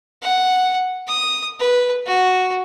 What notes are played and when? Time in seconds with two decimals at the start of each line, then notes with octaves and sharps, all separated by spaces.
0.23 F#5
1.08 D#6
1.60 B4
2.06 F#4